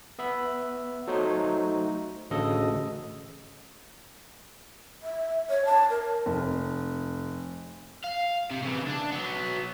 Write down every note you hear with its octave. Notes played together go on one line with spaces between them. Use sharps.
B3 E5 B5
F#3 A3 D#4 F#4 C5 C#5
A1 D2 C#3 A4 D#5
E5
C#5
A5
A#4
F1
F5
C3
C#3 E3
D4
F#3 B3